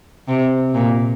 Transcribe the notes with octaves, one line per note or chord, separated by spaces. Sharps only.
C3
A#2